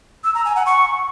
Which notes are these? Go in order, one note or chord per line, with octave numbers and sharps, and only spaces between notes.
E6
A#5
G#5
F#5
C#6